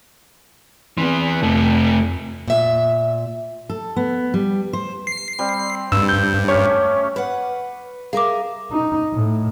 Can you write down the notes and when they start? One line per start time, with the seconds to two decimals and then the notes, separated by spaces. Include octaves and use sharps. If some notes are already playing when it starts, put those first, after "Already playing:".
0.98 E3 B3 C4
1.43 F2 C3 A3
2.48 A#2 E5
3.69 A4
3.96 B3
4.34 G3
4.73 C5
5.07 C7
5.39 G3 C4
5.92 G2 C4 E6
6.09 G6
6.48 A3 C#4 G4 C#5
7.16 B4 F#5
8.13 G#4 A#4 E5 F5 D6
8.72 D#4
9.13 A2